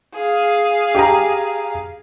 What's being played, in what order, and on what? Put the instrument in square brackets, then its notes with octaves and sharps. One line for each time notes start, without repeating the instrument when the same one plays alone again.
[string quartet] G#4 F5
[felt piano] G4 G#5 A#5